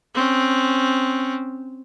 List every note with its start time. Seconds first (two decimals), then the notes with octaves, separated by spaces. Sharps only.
0.15 C4 C#4